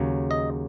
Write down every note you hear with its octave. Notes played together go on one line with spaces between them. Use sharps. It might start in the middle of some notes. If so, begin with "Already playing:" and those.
Already playing: D#2 C#3 F#3
D#5